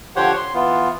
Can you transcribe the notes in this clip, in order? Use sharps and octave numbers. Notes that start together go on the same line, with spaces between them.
D3 F3 G4 C5 C#5 F#5
C6
E3 B3 F4